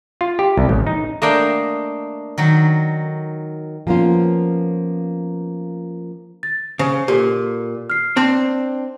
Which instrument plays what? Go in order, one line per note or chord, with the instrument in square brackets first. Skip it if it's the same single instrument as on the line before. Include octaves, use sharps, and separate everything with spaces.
[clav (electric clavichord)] F4
G4
C2
A1
D#4
[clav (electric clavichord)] A3 A#3 D4 [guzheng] D#5 F5 G5
[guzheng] D#3 F#3
[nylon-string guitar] F3 A#3 B3 C#4 F4
[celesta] A6
[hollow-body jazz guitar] C#3 [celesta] C5
[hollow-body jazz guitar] A#2 [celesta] G4 A4
[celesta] F6 C7
[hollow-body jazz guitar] C4 D4